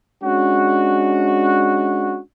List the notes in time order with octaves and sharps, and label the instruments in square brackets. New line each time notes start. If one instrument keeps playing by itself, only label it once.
[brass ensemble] G#3 C#4 D4 F#4